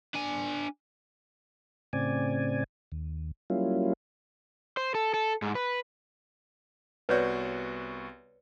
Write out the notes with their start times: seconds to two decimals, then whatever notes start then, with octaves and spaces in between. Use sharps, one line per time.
0.15 D4 G#5
1.93 A2 C#3 C4 D5 G#5
2.92 D#2
3.50 F#3 G3 A#3 C#4 E4 F4
4.77 C5
4.95 A4
5.14 A4
5.42 G#2
5.55 B4
7.09 C2 B3 F#4 B4 C#5 D5